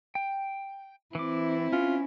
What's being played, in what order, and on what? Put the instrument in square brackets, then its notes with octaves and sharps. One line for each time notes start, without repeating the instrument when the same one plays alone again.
[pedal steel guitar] G5
[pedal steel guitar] E3 D6 [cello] C4 E4
[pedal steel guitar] C#4 [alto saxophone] F4